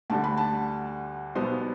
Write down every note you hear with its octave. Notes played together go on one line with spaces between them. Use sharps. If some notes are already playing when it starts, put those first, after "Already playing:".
D2 D3 G3 A5
B5
A5
B1 B2 G3 B3 C5